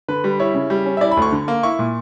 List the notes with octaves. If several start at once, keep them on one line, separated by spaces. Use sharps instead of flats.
D3 B4
G3
E4 C#5
C#3
G3
C#4
E5
E4 D5
B5
D2 C#6
D3
A#3
E4 C#6
A#2